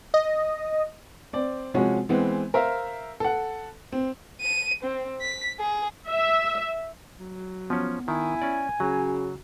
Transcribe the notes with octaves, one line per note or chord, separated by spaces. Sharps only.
D#5
C4 D5
C3 F3 G#3 C#4 F#4
E3 G#3 B3 C4
A#4 C5 E5 F5
A4 F#5
C4
D#7
C4
B6
G#4
E5
F#3
F3 B3 C#4
D#3 E4 G#5
C#4 D5
C#3 F#3 F#4